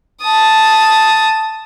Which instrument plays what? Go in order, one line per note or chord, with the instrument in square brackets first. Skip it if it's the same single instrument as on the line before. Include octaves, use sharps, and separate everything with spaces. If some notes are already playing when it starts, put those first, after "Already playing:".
[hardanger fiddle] A5 D#6